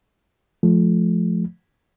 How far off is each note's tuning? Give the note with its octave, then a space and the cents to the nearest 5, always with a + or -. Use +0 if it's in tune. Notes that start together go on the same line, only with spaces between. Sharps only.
F3 +0 A3 -30